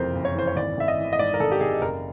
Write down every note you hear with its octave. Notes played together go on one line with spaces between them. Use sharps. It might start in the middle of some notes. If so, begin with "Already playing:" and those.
Already playing: F#1 F2 C3 E3 A#4 C5
F#1
C#5
E3 C5
C#5
G#1 D5
G#1 E5
D#5
E3
D#5
G#2 D5
A#4
G#1 A4
G4
G#1 G#4
F#1 A#4